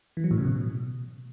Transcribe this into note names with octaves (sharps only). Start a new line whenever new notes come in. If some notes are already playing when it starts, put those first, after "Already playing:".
E3
F#3
A2
C#3
B2